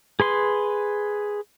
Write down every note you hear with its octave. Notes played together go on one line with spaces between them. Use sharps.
G#4 B4 C6